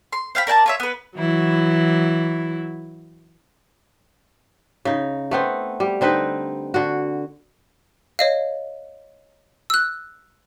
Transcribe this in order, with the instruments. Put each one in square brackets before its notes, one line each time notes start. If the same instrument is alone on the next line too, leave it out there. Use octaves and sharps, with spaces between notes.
[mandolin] C6
C5 F5 G5 B5
A#4 D5 G5 A5
F4 C#5 E5
B3 B4
[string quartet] E3 F#3 E4
[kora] C#3 D#4
A3 B3 C4
G3
D3 C4 D#4 B4
D3 F#4
[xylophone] C#5 D#5 F5
E6 F#6